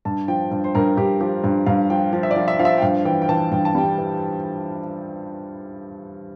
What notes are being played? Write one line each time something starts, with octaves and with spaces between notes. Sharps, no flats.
G2 A5
F3 G5
G2
C5
G2 A#4
G2 G4
F3 G4
G2
G2 F5
F3 G5
F3
E5
D5
F3
E5
F3 F5
E5
G5
G2 F5
E3 G5
G5
E3 A5
G2 G5
A5
G3 G5
E3